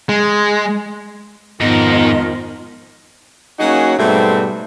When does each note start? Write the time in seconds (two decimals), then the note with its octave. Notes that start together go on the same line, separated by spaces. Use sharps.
0.09 G#3
1.61 F2 G#2 D#3 F3 B3 D#5
3.60 F#3 A#3 C#4 D#4 F#4 G#4
3.98 G#2 B2 G3 A3 C4